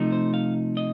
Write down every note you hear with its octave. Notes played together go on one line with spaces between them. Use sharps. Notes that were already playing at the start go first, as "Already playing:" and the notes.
Already playing: C3 F3 A3 D#4
C5
F5
D#5